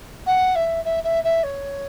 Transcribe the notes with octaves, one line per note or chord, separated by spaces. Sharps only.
F#5
E5
E5
E5
E5
C#5